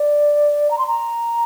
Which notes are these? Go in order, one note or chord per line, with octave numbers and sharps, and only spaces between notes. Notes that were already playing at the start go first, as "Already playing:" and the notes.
Already playing: D5
A#5
C6
A#5